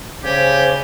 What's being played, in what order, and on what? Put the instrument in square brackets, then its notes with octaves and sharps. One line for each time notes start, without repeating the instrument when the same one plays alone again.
[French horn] C#3 [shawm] G4 [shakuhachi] C5 [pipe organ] D5 G#5